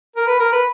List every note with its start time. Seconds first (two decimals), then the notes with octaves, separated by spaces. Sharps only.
0.16 A#4
0.27 B4
0.39 A#4
0.52 B4